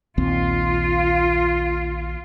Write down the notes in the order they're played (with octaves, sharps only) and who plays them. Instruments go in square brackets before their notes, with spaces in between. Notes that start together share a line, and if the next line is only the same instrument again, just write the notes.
[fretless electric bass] A#1 D#2 C4 [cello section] F4